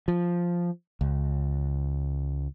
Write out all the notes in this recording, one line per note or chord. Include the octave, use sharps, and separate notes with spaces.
F3
C#2